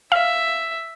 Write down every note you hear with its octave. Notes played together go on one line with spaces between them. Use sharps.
E5 F5